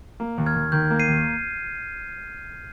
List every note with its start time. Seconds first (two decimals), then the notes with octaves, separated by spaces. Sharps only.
0.20 A#3
0.38 D#2
0.46 F6 G#6
0.55 D#2
0.72 D#3 G6
0.90 A#3
0.99 C7 D#7
1.08 D#2